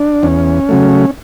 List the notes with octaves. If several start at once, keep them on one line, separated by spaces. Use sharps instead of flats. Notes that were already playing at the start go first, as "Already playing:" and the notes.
Already playing: D4
E2 C#4
C#3 F#3 A3